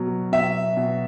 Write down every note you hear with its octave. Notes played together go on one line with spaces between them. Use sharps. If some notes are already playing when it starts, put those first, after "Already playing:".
Already playing: B2 F#3
B2 E5
B2